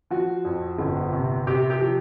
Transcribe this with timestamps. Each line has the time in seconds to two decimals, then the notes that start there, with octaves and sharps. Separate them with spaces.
0.11 F3 F#4
0.45 F2
0.79 G1
1.13 C3
1.47 C3 G4
1.70 G4
1.81 F3